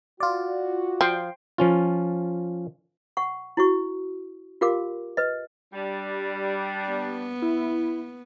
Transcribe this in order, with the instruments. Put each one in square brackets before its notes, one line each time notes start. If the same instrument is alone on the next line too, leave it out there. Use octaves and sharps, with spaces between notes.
[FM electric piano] F4 D5 [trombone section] F#4
[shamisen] F3 [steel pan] G5 C6
[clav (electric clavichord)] F3 C#4 F4
[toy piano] F#5 C#6
E4 F#4 C#6
F4 G4 A#4 F5 D6
B4 D#5
[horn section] G3 D4
[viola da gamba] B3
[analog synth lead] E4